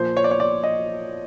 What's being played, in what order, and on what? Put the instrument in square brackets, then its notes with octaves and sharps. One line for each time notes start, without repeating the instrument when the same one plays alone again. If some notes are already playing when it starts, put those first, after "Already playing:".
Already playing: [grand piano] A#2 F3 C5
C#5
D5
C#5
D5
D#5